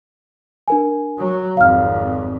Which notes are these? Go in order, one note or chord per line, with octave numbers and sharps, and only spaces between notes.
D4 A#4 G#5
F#3
G#1 F2 F5 F6